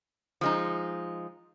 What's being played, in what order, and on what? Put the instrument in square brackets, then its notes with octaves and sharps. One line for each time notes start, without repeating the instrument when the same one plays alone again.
[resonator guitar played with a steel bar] F3 G#3 D#4